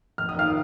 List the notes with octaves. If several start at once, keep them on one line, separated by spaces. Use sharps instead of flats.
F1 F6
D#6
D#2 D#3 F5 F6